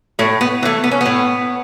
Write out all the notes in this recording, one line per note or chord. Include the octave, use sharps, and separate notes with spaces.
A2 A3
B3
E3 A3
B3
C#4
A2 B3